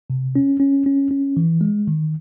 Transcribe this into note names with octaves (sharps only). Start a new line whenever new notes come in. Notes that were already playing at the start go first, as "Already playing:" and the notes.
C3
C#4
C#4
C#4
C#4
E3
G#3
D#3